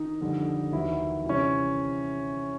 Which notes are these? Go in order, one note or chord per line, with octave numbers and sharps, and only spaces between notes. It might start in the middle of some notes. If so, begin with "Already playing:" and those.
Already playing: D#3 D#4
F2 D3 G3
D#2 D#3 E3 F#3 E4
C3 E3 G3 C#4